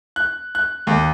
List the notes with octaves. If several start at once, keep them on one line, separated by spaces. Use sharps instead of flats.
F#6
F#6
D#2